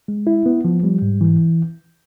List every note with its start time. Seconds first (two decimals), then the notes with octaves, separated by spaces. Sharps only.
0.08 G#3
0.27 E4
0.46 B3
0.65 F3
0.83 G3
1.02 G#2
1.21 E3